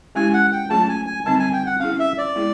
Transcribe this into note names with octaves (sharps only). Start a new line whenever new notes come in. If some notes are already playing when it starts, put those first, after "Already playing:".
G#3 C#4 E4 G4 G#5
F#5
G5
F#3 A3 C#4 F4 G#4 A5
G#5
G#5
D3 G3 C4 D#4 A5
G#5
G5
F#5
C#4 E4 G#4 F5
E5
D5
G#3 B3 E4 G#4